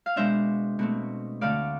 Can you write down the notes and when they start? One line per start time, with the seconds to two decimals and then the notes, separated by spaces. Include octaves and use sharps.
0.06 F5
0.16 B2 G#3 D4 C5 E5
0.79 B2 A3 C4
1.41 D2 D3 A3 D5 F5